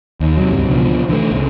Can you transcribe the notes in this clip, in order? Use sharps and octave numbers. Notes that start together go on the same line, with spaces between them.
D#2
C3 F#3
C#2 G2 C3
C#2 B2 D3 F3
D3 E3 F3 A3
C2 C#3